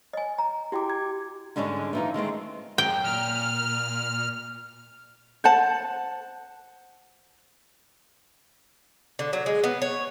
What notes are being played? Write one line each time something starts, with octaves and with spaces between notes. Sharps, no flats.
D#5 G#5
A#5
E4 F#4 G4 G5 D6
G#6
G#2 D3 G3 G#3 C#4
E3 F3 D#4
D#3 G#3 A3 C4
F#2 G5
A#2 F6
C5 F#5 A5
D3
F#3
G#3
B3
C#5